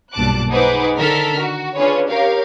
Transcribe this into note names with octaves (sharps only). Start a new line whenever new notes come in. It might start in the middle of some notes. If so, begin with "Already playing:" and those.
B1 G2 A#2 A5 D6 F#6
D#4 G#4 B4 C5 F#5 D6
D3 D#3 A4 A#4 F6 B6
F#4
C#4 D4 F4 G#4 B4 C#5
G4 A#4 C#5 F5